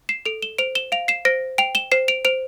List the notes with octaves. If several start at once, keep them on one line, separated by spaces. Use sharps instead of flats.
C7 E7
A4 D7 F7
E7 G7
C5 D7 F7
E7 G7
F5 D7 F7
C7 E7
C5 A#6 D7
G5 D7 F7
E7 G7
C5 C7 E7
D7 F7
C5 D7 F7